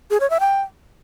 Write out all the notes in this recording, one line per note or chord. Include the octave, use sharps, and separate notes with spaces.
G#4
C#5
E5
G5